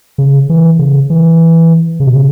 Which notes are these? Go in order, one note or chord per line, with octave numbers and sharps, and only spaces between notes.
C#3
E3
C#3
E3
C#3
B2
C#3